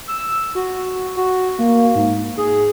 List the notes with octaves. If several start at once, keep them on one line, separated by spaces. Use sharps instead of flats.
E6
F#4
F#4
A#3
G#2
G#4